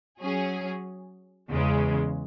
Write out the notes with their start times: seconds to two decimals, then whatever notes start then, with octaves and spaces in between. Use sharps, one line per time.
0.22 F#3 C#4 G#4
1.50 E2 C#3 G#3